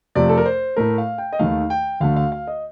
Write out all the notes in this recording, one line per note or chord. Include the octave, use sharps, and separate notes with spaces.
F2 C3 F3 A3 D5
A4
A#4
C5
A2 A3 A#4
F5
G5
D#5
D#2 D#3 A3 F5
G5
D2 D3 A3 F5
F5
F5
D#5